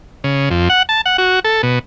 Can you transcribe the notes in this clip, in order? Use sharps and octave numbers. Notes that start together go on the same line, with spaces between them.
C#3
F2
F#5
A5
F#5
F#4
A4
B2